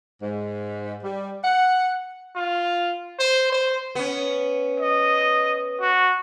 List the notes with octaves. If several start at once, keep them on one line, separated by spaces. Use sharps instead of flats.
G#2
G3
F#5
F4
C5
C5
B3 C#4
D#5
F#4